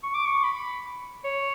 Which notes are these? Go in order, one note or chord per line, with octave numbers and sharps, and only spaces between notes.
C#6
D6
C#6
B5
C#5